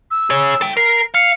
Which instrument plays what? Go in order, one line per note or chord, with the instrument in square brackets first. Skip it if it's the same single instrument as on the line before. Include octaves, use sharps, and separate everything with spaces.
[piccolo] E6
[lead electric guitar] G#4 C#5
A4 G5
[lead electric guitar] A#4 [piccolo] C7
[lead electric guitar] F5 [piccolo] C#7